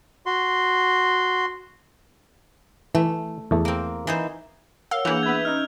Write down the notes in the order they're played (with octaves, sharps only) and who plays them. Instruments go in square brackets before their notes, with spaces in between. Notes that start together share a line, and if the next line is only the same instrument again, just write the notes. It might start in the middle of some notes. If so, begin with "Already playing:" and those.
[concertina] F#4 C6
[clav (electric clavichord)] E3 [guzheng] A3
[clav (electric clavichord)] E2 A3
[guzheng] A#3 C4
E3 D#4 C5
[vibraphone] A#4 C#5 F#5 [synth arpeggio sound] F5 [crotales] E6
[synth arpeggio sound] E3 A#3 [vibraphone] D4 G#4 [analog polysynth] F#5 [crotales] G6 F7
[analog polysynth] B3 B4 E5 [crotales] G#6
[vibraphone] C#4 D#5 [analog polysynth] D#4 [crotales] F6